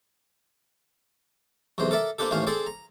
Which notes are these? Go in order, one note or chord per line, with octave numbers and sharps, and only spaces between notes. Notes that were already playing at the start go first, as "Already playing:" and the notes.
B1 E2 C3 C5
A4 A#4 D5 E5
A#3 C4 D4 G4 A4
A1 D#2 A2 C#4 C5 F5
C4 G#4 A4 C5 D5
A#5